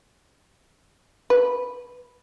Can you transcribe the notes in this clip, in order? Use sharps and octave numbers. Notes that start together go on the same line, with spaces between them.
B4